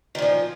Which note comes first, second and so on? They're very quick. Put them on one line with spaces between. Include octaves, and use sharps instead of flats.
D#3 A#2 F3